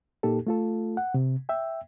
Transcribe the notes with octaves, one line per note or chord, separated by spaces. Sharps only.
A#2 A#3 D#4 G4 A4
A3 F4 A4
F#5
C3
E5 G5